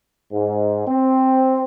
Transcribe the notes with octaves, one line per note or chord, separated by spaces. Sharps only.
G#2
C4